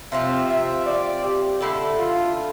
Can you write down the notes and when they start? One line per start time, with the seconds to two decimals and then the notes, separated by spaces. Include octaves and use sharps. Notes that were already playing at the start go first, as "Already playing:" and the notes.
0.12 C3 F3 C4 F4 E5
0.50 E5
0.86 D5
1.24 G4
1.61 D3 A3 E4 A4
1.98 F4